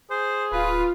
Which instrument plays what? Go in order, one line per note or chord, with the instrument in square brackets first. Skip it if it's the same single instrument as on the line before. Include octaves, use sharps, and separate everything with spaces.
[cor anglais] G#4 [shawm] C5
[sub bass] D1 [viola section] F4 [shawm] B4